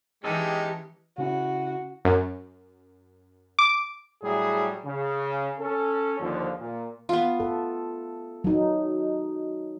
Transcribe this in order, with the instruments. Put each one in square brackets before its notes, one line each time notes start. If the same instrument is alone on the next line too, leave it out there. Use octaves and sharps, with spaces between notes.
[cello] E3 [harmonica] G#3 [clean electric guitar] C#4 D#4 A4 [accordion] G4
[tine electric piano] C#3 C#4 E4 [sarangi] F#4
[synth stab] F#2
D6
[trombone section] A2 F#3 G3 E4 G#4
C#3
C#4 A4
D#2 D3 F3
A#2
[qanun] B3 F4
[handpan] A4
F#3 D#4